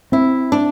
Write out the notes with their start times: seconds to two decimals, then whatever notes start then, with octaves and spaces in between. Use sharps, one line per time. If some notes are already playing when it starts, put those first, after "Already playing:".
0.12 C4 E4
0.52 D4